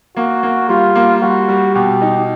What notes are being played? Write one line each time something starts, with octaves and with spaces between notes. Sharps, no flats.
A#3 F#4
A#3
G3 F4
A#3
G3 F#4
G3
B2 G4
D#4